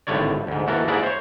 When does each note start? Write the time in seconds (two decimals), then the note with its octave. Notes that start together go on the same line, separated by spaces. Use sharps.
0.07 G#1 A2 D3 G3 C#5 D5
0.47 D2 G#2
0.67 D#2 E3 F#4 A4 A#4
0.87 G#2 G#3 A#3 E4 D5 F#5
1.03 C5 C#5